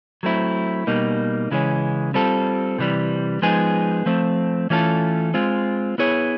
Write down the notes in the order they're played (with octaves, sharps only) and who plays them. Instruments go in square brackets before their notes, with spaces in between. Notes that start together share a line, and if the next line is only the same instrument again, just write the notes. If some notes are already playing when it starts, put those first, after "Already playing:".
[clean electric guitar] F#3 A3 C4 E4
B2 G3 A#3 D#4
C#3 E3 G#3 C#4
G3 C4 F4 A4
C3 E3 G3
F3 G#3 B3 D#4 G#4
F3 A3 C4
E3 A3 C#4 F4 A4
G#3 C4 F4
B3 E4 G#4 C#5